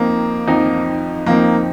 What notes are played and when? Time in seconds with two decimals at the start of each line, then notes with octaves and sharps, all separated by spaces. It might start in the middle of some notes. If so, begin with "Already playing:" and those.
Already playing: F2 F3 A#3 C4 D#4
0.47 F2 F3 C4 D#4
1.26 F2 F3 A#3 C4 D#4